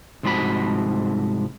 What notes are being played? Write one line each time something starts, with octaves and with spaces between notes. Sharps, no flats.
C2 G#2 F3 C4 F#4 B5